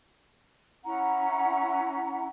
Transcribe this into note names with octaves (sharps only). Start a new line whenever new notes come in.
C#4 E4 F#5 A#5